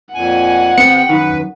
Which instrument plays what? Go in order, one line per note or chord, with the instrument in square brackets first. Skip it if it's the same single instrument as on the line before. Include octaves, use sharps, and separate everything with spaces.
[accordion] F2 A#2 G#5 [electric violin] F#5
[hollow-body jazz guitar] C3 B3 C4 [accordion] G5 [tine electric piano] C#7
[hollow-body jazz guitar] F#2 D#3 [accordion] B4